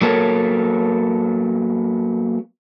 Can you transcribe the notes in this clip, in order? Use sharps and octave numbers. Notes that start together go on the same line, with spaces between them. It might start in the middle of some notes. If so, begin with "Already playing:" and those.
F#3 A#3 B3 A4 A#4 C#5